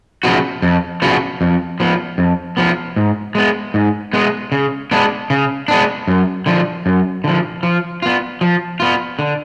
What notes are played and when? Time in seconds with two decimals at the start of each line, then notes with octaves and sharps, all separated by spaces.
0.23 C#3 F3 B3 F#4
0.62 F2
1.02 C#3 F3 B3 F#4
1.41 F2
1.80 F3 B3
2.18 F2
2.57 F3 B3
2.96 G#2
3.35 G#3 B3
3.74 G#2
4.13 G#3 B3
4.52 C#3
4.91 G#3 B3 D4
5.30 C#3
5.68 G#3 B3 D4
6.08 F#2
6.46 D3 F3
6.86 F#2
7.24 D3 F3
7.63 F3
8.02 B3 F4
8.41 F3
8.80 B3 F4
9.19 D3